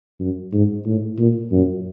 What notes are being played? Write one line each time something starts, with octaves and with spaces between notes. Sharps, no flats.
F#2
G#2
A2
A#2
F#2